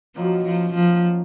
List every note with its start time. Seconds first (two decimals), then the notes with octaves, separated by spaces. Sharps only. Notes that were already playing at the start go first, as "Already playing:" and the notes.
0.16 F#2 D#3 F3 F#3 A#3
0.45 F3
0.74 F3